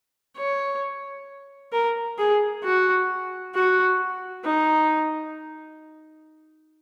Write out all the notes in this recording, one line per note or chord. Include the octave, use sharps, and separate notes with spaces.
C#5
A#4
G#4
F#4
F#4
D#4